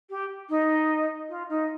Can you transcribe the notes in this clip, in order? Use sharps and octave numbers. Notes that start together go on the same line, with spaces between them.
G4
D#4
F4
D#4